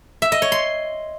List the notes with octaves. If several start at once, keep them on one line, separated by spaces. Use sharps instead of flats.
E5
D#5
C#5
C6